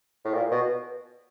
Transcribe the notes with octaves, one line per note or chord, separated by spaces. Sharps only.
A2
A#2
B2